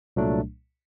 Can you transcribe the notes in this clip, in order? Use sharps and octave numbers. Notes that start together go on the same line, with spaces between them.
C2 A#2 F#3 A3 D4